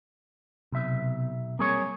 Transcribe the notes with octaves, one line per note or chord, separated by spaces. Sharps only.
B1 C3 B3 E5
G3 A#3 C4 G#4 C#5